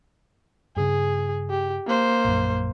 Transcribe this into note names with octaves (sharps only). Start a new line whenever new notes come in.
G2 C#3 G#4
G4
A#3 C5
A#1 F#2